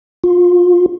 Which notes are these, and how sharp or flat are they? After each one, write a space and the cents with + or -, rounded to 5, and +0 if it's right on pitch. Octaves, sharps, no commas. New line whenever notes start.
F4 +25